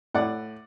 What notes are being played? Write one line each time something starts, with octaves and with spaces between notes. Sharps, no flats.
A2 D5 F#5